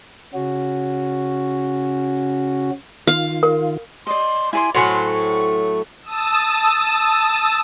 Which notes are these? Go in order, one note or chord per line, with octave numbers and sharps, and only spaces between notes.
C#3 C#4 F#4
D#3 F4 F5
A#4
D5 D#5 C6
E4 D5 G#5 C6
A2 F#3 A3 F#4 C5 G#5 C6
C#6
A5 D#6 E6